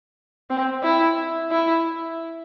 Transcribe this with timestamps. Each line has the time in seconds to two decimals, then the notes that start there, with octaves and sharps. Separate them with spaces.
0.50 C4
0.83 E4
1.51 E4